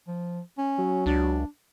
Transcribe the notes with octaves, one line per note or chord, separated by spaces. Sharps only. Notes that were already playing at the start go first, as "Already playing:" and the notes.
F3
C#4
F#3
C#2 D4